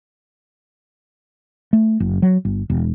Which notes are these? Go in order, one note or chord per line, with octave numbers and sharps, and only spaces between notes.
A3
F#1
F#3
G1
E1